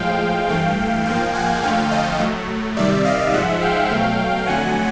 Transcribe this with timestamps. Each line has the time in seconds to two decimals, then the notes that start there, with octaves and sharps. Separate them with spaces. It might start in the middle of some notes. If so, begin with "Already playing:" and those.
Already playing: A2 F3 G#3 F5 G5
0.49 G2 E3 A3 F5 G5
1.06 G#2 F3 A#3 F5 G5
1.34 F#5 G#5
1.63 F2 D3 F3 A3 F5 G5
1.91 D#5 F5
2.20 A2 F#3 A3
2.77 C3 D#3 G3 D5 E5
3.05 D#5 F5
3.33 G#2 F3 G#3 E5 F#5
3.62 F5 G5
3.91 B2 F#3 A3
4.47 F2 D3 F#3 A3 F#5 G#5